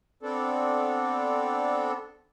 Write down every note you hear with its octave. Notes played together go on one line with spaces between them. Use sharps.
B3 C4 D4 A4